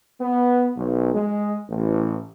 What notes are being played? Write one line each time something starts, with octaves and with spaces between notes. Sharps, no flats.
B3
B1
G#3
A1